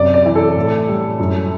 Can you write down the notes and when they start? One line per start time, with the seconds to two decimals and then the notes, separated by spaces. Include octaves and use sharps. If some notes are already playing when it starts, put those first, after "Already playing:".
Already playing: F#2 C3 D5
0.14 D5
0.25 E3
0.35 A4
0.56 A2
0.87 G3
1.19 F#2